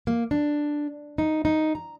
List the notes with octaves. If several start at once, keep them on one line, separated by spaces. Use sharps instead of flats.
A#3
D4
D#4
D#4
A#5